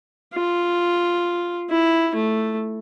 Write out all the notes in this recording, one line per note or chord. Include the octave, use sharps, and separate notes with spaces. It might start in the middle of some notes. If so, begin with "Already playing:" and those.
F4
E4
A3